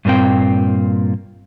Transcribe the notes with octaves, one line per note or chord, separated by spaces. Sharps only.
G2 A#2 A#3 C4 G5